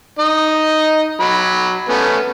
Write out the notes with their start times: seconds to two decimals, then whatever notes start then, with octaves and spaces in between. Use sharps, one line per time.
0.19 D#4 D#5
1.20 F#3 B5
1.89 A3 B3 C#4